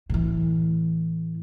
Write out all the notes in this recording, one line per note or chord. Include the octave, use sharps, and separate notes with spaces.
A2 E3